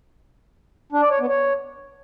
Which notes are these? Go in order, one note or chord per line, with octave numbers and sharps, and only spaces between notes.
D4
D5
C#5
B3
C#5